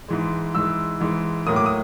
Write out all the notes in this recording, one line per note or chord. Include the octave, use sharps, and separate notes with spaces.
G#2 E3 G#3
G#2 E3 G#3 E6
G#2 E3 G#3
A2 F#3 A#3 D#6
D6
D#6